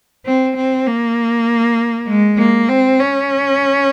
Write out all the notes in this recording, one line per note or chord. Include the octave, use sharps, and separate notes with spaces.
C4
C4
A#3
G#3
A#3
C4
C#4